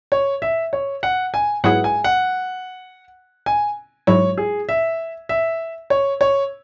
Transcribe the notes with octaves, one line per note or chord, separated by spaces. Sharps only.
C#5
E5
C#5
F#5
G#5
G#2 F#3 B3 E4 G#4 F#5
G#5
F#5
G#5
G#2 F#3 E4 C#5
G#4
E5
E5
C#5
C#5